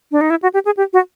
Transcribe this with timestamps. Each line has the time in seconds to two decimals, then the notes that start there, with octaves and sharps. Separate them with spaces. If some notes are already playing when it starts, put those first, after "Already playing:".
0.12 D4
0.21 D#4
0.30 E4
0.43 F#4
0.54 G4
0.65 G#4
0.77 G4
0.93 F#4